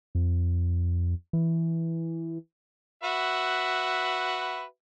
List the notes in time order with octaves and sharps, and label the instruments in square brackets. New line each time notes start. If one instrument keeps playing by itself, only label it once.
[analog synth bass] F2
E3
[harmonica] F#4 B4 E5